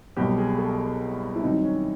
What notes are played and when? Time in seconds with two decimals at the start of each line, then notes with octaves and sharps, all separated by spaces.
0.16 C2 B2 F#3 G4
0.38 G#4
0.58 A4
1.36 E4
1.42 C2 C3 D#3 F#3 D#4
1.63 C#4